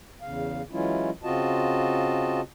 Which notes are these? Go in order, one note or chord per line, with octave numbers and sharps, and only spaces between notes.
E2 C#3 F5
E3 F#3 G#3 C#4 E4 F4
C#3 C4 F4 F#4 D#5 A5